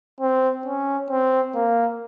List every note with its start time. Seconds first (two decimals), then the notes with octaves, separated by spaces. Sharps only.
0.21 C4
0.66 C#4
1.10 C4
1.55 A#3